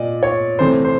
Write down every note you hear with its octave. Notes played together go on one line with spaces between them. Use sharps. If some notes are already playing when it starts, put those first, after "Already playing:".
Already playing: A#2 D5 D#5
C#5
C3 E3 A3 C5
C5